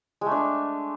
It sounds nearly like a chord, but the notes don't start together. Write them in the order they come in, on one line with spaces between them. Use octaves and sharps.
G#3 A3 D4